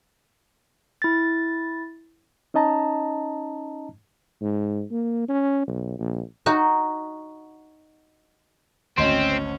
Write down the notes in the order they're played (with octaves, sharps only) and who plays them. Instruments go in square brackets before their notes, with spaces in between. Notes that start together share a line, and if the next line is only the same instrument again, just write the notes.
[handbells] E4 A6
[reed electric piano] C#4 D#4 D#5 A5 A#5
[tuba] G#2
A#3
C#4
B1
A#1
[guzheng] D#4 F#4
[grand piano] G#1 D2 [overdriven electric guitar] C4 [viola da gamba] C#4 [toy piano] D#5 C6